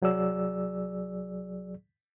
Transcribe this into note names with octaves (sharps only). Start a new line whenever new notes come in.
C2 F#3 G#4 D5 E6